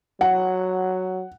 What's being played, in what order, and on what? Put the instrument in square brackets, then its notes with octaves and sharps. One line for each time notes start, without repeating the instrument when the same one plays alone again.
[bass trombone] F#3 [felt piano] F#5